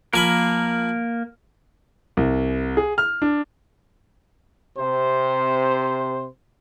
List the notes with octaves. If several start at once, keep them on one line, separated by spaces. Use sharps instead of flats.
F3 A#3 A#4 G#5 B5
C2
G#4
F6
D4
C3 C5